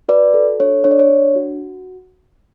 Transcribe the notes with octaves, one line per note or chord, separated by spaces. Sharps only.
F#4 B4 D5
A4
D4 C#5
D4 C#5
D5
C#5
D4
F#4